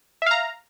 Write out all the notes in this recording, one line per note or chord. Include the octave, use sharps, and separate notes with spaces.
E5 F5 A#5